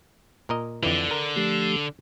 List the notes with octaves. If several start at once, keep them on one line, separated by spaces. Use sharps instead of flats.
A#2 A#4 D#5
F2 D3 E3
A#4
F3 A3 G4